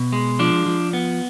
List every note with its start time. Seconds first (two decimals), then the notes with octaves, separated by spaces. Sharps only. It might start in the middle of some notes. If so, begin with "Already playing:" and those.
Already playing: B2
0.12 G#3
0.39 F3 D4
0.66 F3
0.93 B3